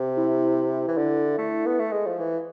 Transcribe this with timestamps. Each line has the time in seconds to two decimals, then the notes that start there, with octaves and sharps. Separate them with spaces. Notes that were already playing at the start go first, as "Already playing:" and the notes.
Already playing: C3
0.17 E4
0.88 E3
0.98 D3
1.38 A3
1.66 B3
1.80 A3
1.92 G#3
2.07 F3
2.20 E3